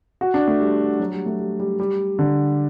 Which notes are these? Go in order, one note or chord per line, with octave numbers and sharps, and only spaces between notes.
F#4
D4
A3
G3
F#3
G3
A3
G3
G3
G3
D3